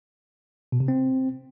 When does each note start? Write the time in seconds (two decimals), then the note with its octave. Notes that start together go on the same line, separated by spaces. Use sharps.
0.72 B2
0.80 C3
0.88 C4